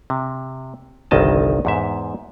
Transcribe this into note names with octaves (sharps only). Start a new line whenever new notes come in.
C3
G1 C2 D#3 D#5 A5
E2 G#2 E5